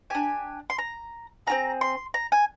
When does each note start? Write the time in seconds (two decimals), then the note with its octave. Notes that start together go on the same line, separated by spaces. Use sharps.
0.10 D4 G4 G#5
0.70 C6
0.78 A#5
1.47 C4 F4 G#4 A#5
1.81 C6
2.14 A#5
2.32 G#5